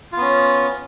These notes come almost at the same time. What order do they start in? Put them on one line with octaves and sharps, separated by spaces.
F4 B3 C#4